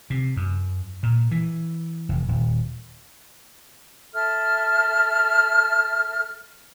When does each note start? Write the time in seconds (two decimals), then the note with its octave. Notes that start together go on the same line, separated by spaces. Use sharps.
0.10 C3
0.37 F#2
1.03 A#2
1.31 E3
2.09 F1
2.28 D#1
4.13 A4 E5 F6